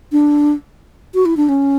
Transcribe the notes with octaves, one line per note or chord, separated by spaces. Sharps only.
D4
F#4
E4
D4
C#4